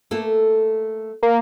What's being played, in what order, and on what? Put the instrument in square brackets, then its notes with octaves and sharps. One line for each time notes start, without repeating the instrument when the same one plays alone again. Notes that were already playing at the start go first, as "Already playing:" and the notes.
[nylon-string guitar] A3 A#3 A4
[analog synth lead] A#3